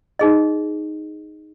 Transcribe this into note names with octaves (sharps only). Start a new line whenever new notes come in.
D#4 G#4 D#5